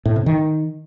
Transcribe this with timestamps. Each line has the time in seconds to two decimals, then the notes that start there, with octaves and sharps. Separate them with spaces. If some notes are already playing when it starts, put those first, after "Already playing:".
0.05 A2
0.16 C3
0.26 D#3